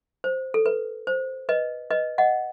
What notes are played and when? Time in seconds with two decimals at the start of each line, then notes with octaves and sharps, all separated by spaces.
0.24 C5
0.54 A4
0.66 B4
1.07 C5
1.49 B4 D#5
1.90 B4 D#5
2.18 D#5 F#5